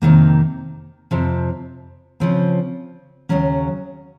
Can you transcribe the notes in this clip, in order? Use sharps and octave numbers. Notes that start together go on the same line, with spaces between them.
F2 C3 D#3 A#3
F2 C3 F3
C#3 F3 C4
D#2 C#3 F#3 C#4